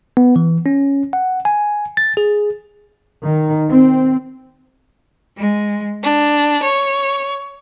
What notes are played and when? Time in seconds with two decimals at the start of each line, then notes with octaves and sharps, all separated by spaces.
0.17 B3
0.36 E3
0.66 C#4
1.13 F#5
1.45 G#5
1.97 A6
2.17 G#4
3.23 D#3
3.70 C4
5.38 G#3
6.03 D4
6.62 C#5